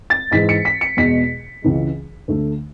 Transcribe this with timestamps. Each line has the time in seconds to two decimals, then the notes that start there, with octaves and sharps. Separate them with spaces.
0.10 A6
0.31 G#2 E3 G#3 B6
0.49 C#7
0.65 B6
0.81 C#7
0.97 E2 B2 G#3 B6
1.62 C#2 C#3 E3 G#3
2.28 D2 D3 A3